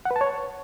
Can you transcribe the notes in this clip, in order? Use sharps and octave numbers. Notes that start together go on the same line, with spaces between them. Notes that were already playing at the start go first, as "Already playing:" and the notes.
F#5
B4
A5
C#5